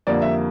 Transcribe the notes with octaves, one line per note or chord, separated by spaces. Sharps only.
F2 D3 G3 A#3 D5
E5